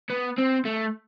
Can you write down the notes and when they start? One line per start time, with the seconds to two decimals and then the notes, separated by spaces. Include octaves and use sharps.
0.10 B3
0.38 C4
0.65 A3